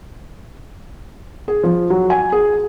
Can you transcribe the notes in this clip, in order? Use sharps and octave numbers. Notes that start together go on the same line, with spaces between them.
G#4
F3
F#3
G#5
G#4